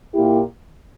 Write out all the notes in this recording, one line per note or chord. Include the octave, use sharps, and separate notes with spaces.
A#2 A#3 E4 G4